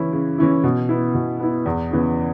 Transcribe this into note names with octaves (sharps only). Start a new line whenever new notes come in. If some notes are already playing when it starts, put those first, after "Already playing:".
Already playing: C#3 E3 C#4 E4
C#3
E3 C#4 E4
B2
B3 E4
B2
B3 E4
E2
C#3 E3 B3